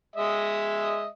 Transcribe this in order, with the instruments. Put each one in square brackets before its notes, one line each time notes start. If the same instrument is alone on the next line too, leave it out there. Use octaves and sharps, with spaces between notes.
[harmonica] G#3 D#5 E5